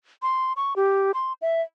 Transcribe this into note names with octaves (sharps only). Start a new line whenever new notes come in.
C6
C#6
G4
C6
E5